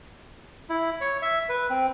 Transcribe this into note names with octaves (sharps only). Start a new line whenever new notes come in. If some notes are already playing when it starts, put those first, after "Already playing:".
E4
C#5
E5
B4
C4